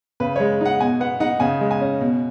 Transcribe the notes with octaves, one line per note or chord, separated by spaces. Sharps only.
C#3 B4
G#3 C#5
D#4 F#5
B2 G#5
B3 F#5
D#4 F#5
C#3 G#5
G#3
G#5
C#4
B2